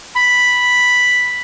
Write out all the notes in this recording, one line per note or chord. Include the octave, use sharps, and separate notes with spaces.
B5